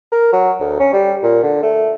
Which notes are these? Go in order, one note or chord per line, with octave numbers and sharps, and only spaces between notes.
A#4
F#3
D2
C#4
G3
A#2
D3
A3